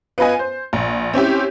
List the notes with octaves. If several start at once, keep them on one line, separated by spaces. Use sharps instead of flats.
B3 F4 B4 D#5 G#5
C5
A#1
C4 C#4 E4 G4